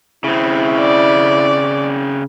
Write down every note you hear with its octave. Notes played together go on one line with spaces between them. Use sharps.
C#3 C4 E4
D5